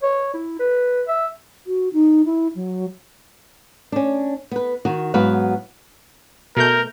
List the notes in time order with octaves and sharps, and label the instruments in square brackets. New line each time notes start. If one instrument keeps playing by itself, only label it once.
[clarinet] C#5
E4
B4
E5
[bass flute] F#4
D#4
E4
F#3
[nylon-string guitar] C#4 D4
B3 B4
D#3 F#4
G#2 F#3 B3 F#4 B4 F5
[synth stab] B2 A3 G6 [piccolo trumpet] A#4